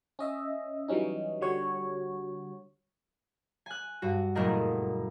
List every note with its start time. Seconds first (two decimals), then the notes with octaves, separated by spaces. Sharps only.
0.19 C#4 D#5 E5
0.88 E3 F#3 G3 C#4 D#4
1.41 D3 G3 F#4 C#5
3.66 G#5 F#6
4.02 G2 F#4
4.35 F#1 A#2 A3 G#4 A#4 D#5